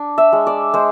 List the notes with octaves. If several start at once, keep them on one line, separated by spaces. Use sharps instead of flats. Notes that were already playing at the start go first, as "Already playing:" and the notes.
Already playing: D4
E5
G#3
D5
G#3 C5